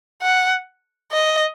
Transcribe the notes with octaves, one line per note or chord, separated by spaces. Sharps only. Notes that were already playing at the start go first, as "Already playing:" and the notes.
F#5
D#5